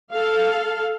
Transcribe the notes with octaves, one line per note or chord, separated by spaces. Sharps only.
A4 F5